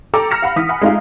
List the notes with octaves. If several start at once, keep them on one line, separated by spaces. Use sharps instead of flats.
A4 G5 A#5 D6
A#5 F6 A#6 C#7 E7
F5 F#5 B5
E3 D#6 B6
F#5 G#5 B5
G#3 A3 D#4 F4 F5